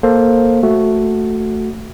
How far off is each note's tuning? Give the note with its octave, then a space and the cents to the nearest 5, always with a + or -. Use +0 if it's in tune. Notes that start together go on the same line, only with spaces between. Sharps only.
A#3 +0 A4 +0 C5 +10
A3 +0 F#4 +0